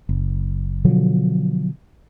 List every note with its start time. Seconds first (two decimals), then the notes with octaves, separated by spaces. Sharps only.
0.09 F#1
0.84 B2 D3 F3 F#3